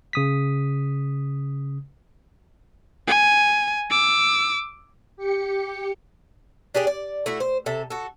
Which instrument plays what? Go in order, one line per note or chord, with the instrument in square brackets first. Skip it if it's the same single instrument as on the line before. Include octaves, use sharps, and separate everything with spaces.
[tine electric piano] C#3 D#6 B6
[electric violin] G#5
D6 E6
[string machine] G4 C#7
[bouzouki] D4 G4 G#4 D5
D5
A3 E4 F#4
C5
C3 A4 E5
F#4 A4